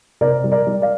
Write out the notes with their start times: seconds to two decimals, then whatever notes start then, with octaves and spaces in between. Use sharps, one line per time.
0.21 C3 A#4 D5
0.44 G3
0.52 A#4 D5
0.67 G3
0.82 D5 F5